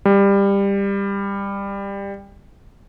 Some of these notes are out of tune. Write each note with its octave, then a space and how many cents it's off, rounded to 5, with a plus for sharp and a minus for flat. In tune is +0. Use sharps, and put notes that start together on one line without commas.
G3 +20